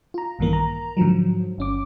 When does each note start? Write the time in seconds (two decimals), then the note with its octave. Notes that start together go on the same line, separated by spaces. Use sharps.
0.14 F4 A#5
0.39 A#1 G2 D#3 E3 A#3 A#4
0.53 A#5
0.97 G#2 D3 F3 F#3
1.58 G1 C#4 D6